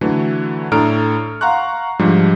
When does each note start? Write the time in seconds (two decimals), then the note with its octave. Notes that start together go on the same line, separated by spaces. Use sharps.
0.01 D3 E3 F#3 A3
0.72 A2 D4 A4 A#5 F6 D7
1.41 F5 F#5 A#5 C6 C#6 F#6
1.99 G#2 F3 G3 D4